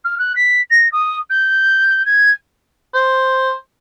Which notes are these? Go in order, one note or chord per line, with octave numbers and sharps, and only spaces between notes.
F6
F#6
B6
A#6
D#6
G6
G#6
C5